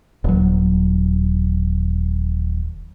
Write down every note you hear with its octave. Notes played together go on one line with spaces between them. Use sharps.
D#1 F#3